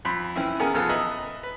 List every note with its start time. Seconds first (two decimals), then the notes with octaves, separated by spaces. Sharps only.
0.05 F2 B5 C6
0.36 E3 C4 C#4 E4
0.59 D#3 B3 C#4 G#4 A#4
0.74 B1 F2 B3 F4 A4
0.89 B4 D#5 E5 A#5 B5
1.43 B4